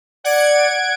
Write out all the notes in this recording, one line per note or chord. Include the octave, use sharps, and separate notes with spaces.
D5 F#5 G#6 D7